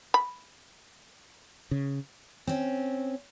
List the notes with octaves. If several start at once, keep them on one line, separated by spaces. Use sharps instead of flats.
B5
C#3
C4 C#4